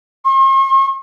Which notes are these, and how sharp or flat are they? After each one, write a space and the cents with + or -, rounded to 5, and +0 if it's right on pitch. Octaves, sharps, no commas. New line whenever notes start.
C6 +45